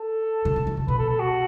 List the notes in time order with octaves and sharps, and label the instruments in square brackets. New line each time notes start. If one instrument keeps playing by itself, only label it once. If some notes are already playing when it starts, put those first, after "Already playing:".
Already playing: [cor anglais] A4
[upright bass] C#3
B2
E3
C#3
[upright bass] B2 [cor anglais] B4
[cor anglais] A4
A4
F#4